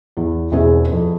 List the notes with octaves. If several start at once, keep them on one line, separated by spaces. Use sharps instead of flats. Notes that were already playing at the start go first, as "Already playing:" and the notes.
E2
E1 E2 C4 G#4 E5
F2